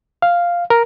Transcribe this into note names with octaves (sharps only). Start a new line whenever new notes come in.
F5
A#4